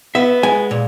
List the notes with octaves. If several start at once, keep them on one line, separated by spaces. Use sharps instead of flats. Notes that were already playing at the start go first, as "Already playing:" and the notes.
B3 E5
G#3 G#5
A#2